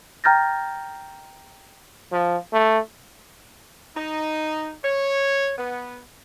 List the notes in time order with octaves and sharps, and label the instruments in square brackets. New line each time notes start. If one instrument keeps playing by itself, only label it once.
[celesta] G5 A#5 F6 G6 A6 A#6
[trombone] F3
A3
[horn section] D#4
C#5
B3